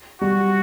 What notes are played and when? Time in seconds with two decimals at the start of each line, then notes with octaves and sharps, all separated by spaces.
0.21 G3 F#4